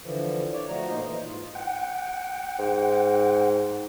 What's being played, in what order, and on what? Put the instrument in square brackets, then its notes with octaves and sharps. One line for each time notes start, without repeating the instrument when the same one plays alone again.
[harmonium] D3 E3 F3
C#5 D5
F3 A3 F#4 A#5
A#2 A#3 D#4 C5 D#5
E3
G#2 F4
[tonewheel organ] F#5 G5
[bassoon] G#2